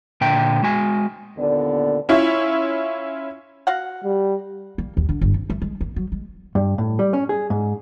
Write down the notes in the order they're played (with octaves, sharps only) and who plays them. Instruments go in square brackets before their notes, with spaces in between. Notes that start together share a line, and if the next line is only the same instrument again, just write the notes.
[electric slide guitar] A#2 D3 E5 G5 A#5
G#3 F#4 G#5
[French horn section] D#2 A#2 D3 B3 D5
[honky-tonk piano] C#4 E4 F4 E5 C#6
[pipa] F#4 F5 F#5
[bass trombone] G3
[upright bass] A#3
D#2
D3
G1
C3
A3
G#3
A#3
F#3
G#3
[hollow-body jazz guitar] G2
A2
G3
C#4
G#4
G#2